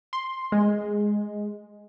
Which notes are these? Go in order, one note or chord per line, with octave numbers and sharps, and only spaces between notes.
C6
G#3